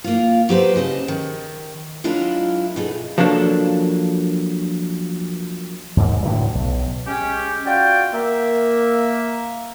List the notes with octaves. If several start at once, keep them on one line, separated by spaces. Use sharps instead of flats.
A#3 F4
F#3 G4 B4 C5
C#3 D#5 A5
D#3
F#3 G#3 D4 E4 F4 A#4
B2 D#4 G#4 A4
F3 F#3 A#3 D4 A4
D#2 G#2
A2 D3 E3 F#3
B1
G#3 C#4 G4
F4 F#4 D5 G5
A#3 E5